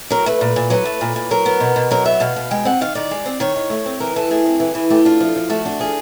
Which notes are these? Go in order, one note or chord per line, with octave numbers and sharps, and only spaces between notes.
F#3 A#4
A3 B4
A#2
A#2
F#3 B4
A3
A#2
A#2
F#3 A#4
B3
B2
B2
F#3 A#4
B3 E5
B2 F5
B2
G#3 G5
C4 F#5
D#3 F5
D#3 D5
G#3
C4
D#3 C#5
D#3
A3
C4
E3 A#4
E3 A4
A3 G#4
C4
E3
E3
A3 G4
D4 F4
F3
F3
A3 F#4
D4 F#4
F3 G#4